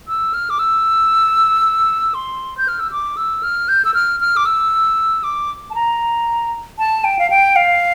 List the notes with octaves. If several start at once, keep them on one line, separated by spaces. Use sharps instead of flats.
E6
F6
D6
E6
C6
G6
F6
E6
D6
E6
F6
G6
E6
F6
F6
D6
E6
D6
A5
A#5
A5
G5
F5
G5
F5